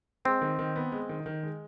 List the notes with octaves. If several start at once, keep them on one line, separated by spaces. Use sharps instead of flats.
G#3 C4
D#3
D#3
B3
G#3
D#3
D#3
G#3